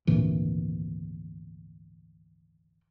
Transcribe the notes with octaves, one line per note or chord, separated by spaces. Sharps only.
G#1 D2 A#2 E3